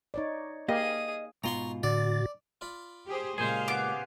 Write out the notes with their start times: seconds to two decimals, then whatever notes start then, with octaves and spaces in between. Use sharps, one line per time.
0.14 D#4 C#5 D5
0.68 A#3 G4 G#4 D#5 F5 D#6
1.44 G#2 B2 F4 A#5 C6 C#6
1.83 A2 D3 F#4 D5 A6
2.61 F4 D5 B5
3.07 G4 G#4 C5
3.38 A#2 C#3 G#3 G4 G#4 C5 F5
3.68 B3 D6